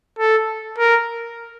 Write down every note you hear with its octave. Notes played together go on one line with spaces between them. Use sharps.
A4
A#4